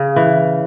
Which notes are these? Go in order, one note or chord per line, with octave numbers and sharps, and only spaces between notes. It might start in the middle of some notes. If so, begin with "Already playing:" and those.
Already playing: C#3
E3